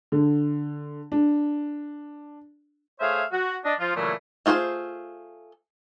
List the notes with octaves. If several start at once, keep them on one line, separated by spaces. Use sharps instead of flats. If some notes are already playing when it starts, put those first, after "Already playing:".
D3
D4
A3 G#4 C5 C#5 E5 F5
F#4
D4 D#5
F3 F4
A#2 C#3 E3 F#3 G3 A3
A3 F4 G#4 B4 C5